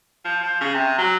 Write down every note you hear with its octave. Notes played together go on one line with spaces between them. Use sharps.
F3
F3
C#3
C3
F#3